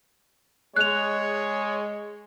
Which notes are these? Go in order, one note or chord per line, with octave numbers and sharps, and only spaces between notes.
G#3 C#5 F#6 F7